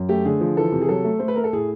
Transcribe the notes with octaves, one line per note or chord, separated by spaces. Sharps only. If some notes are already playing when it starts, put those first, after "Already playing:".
Already playing: F#2
A3 G4
D3 G#4
F3
E3 A4
C3
G#4
F#3 A4
A3
A3 C5
B4
A3 A#4
A4
A2 G#4